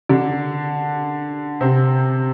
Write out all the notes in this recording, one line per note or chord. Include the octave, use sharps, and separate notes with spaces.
D3 D4
C3 C4